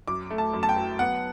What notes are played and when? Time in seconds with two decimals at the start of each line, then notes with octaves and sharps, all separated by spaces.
0.08 F#2 D6
0.30 A3
0.38 A5
0.54 F#2
0.63 A5
0.69 G5
0.76 F#3
0.99 B3 F#5